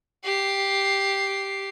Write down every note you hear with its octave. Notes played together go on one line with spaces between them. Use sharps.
G4 C7